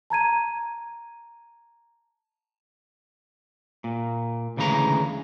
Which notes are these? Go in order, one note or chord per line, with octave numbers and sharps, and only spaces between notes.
A5 A#5 G#6 D#7
A#2
D2 C#3 E3 G#3 A#5